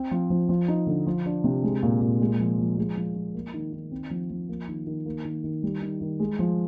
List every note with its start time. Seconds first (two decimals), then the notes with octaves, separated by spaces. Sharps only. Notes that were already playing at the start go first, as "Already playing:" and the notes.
Already playing: C4
0.11 F3
0.30 F3
0.49 F3
0.68 D#4
0.87 D3
1.07 F3
1.26 D4
1.44 C3
1.63 G#3
1.83 A#2
2.01 A#2
2.21 G#3
2.39 F3
2.59 F3
2.78 G#3
2.97 F3
3.15 F3
3.34 A#3
3.54 D#3
3.73 D#3
3.91 C4
4.10 F3
4.30 F3
4.49 A#3
4.68 D#3
4.87 D#3
5.06 A#3
5.25 D#3
5.44 D#3
5.63 G3
5.82 D#3
6.01 D#3
6.20 G#3
6.39 F3